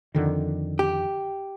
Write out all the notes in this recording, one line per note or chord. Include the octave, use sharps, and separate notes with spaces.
F2 D3 D#3
G4